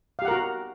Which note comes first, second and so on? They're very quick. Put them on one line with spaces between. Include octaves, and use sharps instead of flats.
F5 G4 F#5 A#4 F#4